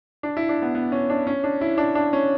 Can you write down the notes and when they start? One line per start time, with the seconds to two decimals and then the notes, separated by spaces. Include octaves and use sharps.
0.23 D4
0.37 E4
0.49 D4
0.62 B3
0.75 B3
0.92 C#4
1.10 D4
1.27 C#4
1.44 D4
1.61 E4
1.78 D4
1.95 D4
2.13 C#4